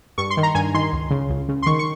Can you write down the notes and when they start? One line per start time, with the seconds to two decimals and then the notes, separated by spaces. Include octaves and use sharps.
0.18 G2 C#6
0.30 C6
0.37 D#3
0.43 A#5
0.55 G2 G#5
0.74 D#3 C6
0.93 C#2
1.11 C#3
1.30 C#2
1.49 C#3
1.62 C6
1.66 D#3 C#6
1.79 C#6